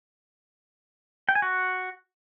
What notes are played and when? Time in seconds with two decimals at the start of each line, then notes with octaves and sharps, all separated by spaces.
1.29 G5
1.35 G#5
1.42 F#4